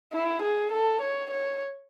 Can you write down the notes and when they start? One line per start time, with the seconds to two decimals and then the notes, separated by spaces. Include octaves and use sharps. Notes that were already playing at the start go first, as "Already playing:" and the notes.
0.13 E4
0.43 G#4
0.72 A4
1.02 C#5
1.31 C#5